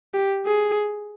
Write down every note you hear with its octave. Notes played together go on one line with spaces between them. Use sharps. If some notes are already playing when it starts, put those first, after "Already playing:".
G4
G#4